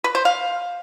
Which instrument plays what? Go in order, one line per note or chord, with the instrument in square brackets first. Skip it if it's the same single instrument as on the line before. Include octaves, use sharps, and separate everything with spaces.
[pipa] B4
C5
F5